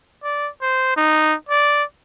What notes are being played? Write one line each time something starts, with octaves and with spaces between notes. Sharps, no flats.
D5
C5
D#4
D5